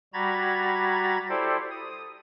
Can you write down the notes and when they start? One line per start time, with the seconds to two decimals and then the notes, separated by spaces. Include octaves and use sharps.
0.14 G3 F#4 A#5 B5 G#6 A6
1.29 E4 G4 A4 C5 D5
1.71 D#6